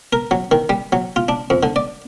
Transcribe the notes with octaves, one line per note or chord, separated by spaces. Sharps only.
A#4
F#3
D#3
G3
F#3
F4
D4
F2
D3
D5